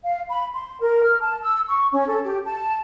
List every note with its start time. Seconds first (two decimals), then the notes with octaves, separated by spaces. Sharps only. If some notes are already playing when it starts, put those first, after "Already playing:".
0.04 F5
0.30 B5
0.54 C6
0.80 A#4
1.03 F6
1.21 A5
1.42 E6
1.68 C#6
1.91 C#4
2.08 A4
2.24 G4
2.45 A5